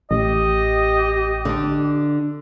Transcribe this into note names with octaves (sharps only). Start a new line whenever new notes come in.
A1 G4 D#5
D3 D4